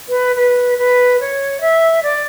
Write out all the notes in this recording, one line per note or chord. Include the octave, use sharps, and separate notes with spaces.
B4
B4
B4
C#5
E5
D5